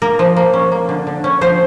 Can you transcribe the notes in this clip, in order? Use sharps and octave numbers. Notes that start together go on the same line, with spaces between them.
A#3 A#4
F3
A#3
C#4
A#3
D3
D3
C#4
F3 C5